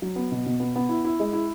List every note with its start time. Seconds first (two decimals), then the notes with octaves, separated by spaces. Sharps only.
0.02 F#3
0.16 B3
0.31 B2
0.46 B2
0.60 B3
0.76 B3
0.89 E4
1.05 E4
1.20 G#3
1.33 E4